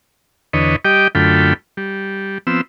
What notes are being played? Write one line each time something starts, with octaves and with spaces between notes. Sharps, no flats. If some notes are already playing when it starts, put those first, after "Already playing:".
E2 D3 B4 C#5 D#5
G3 G4 D#5 G5 D6
F#2 D3 A3 F4 G5 B5
G3
F3 B3 C4 E6